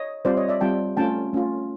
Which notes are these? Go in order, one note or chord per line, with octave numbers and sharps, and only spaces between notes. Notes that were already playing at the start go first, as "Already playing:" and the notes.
Already playing: C#5 D#5
G3 C4 F4 C5 D5
C#5 D#5
D5 E5
G3 C4 F4 G5 A5
A3 C#4 F4 G5 A5
A3 C#4 F4